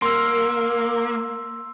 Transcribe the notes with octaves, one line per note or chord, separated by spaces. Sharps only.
A#3 C6 E6